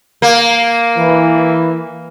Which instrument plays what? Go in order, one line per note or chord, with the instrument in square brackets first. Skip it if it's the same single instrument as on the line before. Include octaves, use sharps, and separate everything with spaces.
[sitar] A#3
[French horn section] E3